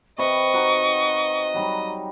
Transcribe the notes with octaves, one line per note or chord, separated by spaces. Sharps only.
C3 B4 D#5 C#6
D#4 F#4
F#3 G3 D#4